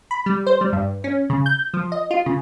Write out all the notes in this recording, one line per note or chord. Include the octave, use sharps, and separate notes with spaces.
B5
G3
C5
G3
G2
C#4
C#3
G6
F3
D#5
F4
C#3